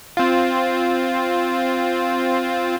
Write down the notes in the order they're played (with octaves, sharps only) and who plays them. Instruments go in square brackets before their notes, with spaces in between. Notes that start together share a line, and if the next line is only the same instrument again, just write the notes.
[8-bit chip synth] C4 F4